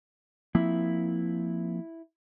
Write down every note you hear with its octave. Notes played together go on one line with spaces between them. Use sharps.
F3 A#3 C4 E4